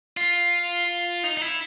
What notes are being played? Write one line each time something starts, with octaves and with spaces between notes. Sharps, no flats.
F4
D#4
D#4
E4